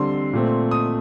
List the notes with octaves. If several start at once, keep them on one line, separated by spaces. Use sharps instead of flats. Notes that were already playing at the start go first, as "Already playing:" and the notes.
Already playing: D3 G3 C4 C6
A#2 A3 C4
D#6